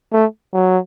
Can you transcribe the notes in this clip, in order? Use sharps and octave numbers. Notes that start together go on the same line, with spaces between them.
A3
F#3